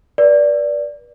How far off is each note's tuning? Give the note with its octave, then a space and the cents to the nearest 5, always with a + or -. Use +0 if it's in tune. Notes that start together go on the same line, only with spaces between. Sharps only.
B4 -35 D5 -10